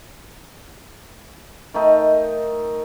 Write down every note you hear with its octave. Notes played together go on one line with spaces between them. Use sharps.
D#3 A3 D#4